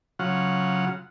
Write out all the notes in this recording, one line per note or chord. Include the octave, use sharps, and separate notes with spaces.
C#3 F#3 F4 F#5